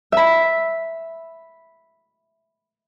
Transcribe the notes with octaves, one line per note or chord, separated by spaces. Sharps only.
E5 B5